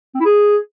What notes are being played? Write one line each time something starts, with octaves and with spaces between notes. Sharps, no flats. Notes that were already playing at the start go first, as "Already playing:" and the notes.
C4
E4
G#4